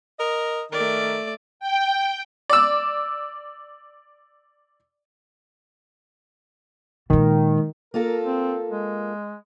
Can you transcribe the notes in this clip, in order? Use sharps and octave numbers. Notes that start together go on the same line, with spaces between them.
A#4 D#5
D#3 A3 A#4 D5
G5
D5 E6
A#2 D#3 G#3
A#3 F4 A4 A#4
C4
G#3